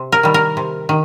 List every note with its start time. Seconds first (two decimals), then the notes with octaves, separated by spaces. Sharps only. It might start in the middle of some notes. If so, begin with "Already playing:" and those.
Already playing: C3
0.12 A#4
0.23 D#3 G3
0.34 A#4
0.57 C3
0.89 D#3